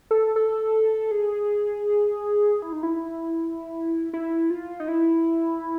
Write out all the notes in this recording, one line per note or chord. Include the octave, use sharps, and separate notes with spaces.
A4
A4
G#4
E4
D#4
E4
E4
F4
D#4
E4